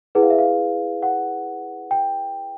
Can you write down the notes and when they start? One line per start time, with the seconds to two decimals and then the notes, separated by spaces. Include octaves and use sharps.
0.15 E4 G#4 B4 F#5
0.23 F5
0.30 E5
0.39 F5
1.03 F#5
1.91 G5